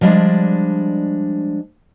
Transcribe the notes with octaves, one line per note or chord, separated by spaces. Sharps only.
F3 G3 G#3 D4